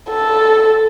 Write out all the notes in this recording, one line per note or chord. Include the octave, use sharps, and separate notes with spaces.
A4